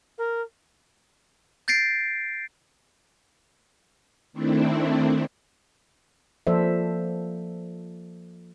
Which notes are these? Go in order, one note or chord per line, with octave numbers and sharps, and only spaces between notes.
A#4
G6 A6 A#6 C7 D7
D#3 A3 C4 D4 E4
F3 A#3 A4 C5 D5 E5